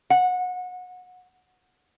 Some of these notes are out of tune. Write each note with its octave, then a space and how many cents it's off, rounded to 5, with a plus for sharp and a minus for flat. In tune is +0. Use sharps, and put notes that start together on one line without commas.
F#5 -25